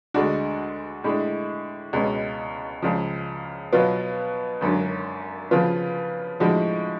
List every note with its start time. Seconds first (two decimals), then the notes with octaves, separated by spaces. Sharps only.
0.14 D2 D3 G#3 D4 F#4
1.04 A2 G#3 D4
1.93 C#2 B2 G#3 C#4
2.82 C#2 C#3 F3
3.73 B2 F#3 B3 F4
4.61 G#1 F#2 D3 F#3
5.51 C#3 F3 B3 F4
6.40 A2 F3 G#3 D4 F#4